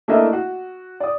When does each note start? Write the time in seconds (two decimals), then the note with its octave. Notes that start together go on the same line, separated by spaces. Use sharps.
0.08 A3 A#3 D4 E4 D#5 E5
0.33 F#4
1.00 D5 D#6